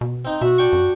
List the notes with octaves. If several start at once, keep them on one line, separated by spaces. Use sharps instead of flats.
B2
C4 D#4
B2 F#4 E5
D4 G5 C#6
F#2